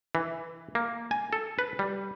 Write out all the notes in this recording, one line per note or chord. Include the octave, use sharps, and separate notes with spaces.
E3
A#3
G#5
A4
B4
G3